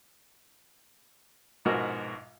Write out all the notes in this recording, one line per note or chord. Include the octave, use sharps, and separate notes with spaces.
A#1 G#2 B2 F#4 A#4